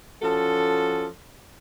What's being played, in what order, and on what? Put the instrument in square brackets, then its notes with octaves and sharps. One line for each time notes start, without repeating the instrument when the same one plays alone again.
[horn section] F3 C#4 F#4 A4